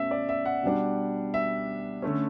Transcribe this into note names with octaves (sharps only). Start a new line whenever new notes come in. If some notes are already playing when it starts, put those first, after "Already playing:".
Already playing: B2 A3 C#4 E5
D5
E5
F#5
B2 G3 D4
E5
D3 A3 C#4